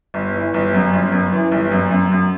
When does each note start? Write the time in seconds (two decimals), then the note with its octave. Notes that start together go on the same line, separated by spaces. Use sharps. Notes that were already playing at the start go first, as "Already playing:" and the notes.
0.14 G1
0.34 E3
0.54 G1
0.73 F#2
0.93 G1
1.12 F#2
1.32 E3
1.52 G1
1.71 F#2
1.91 F#2
2.11 F#2